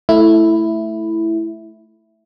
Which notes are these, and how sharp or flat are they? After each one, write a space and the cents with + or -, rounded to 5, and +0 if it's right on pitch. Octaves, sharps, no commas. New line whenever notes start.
A3 +0 E4 +0